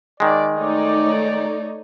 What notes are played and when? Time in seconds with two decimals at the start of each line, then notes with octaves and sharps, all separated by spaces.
0.20 D#3 G#3 D5
0.56 A3 D#4 C#5 D5